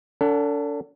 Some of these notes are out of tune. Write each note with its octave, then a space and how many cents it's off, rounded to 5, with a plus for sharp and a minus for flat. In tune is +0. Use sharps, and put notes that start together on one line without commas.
D4 -40 A4 +30 F#5 +0